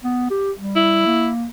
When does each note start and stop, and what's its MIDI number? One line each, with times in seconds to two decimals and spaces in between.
0.04 0.28 59
0.31 0.52 67
0.58 1.03 55
0.76 1.29 64
1.06 1.46 58